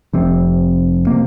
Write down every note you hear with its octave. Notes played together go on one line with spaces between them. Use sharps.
F1 F2 C3 C4
C3 A#3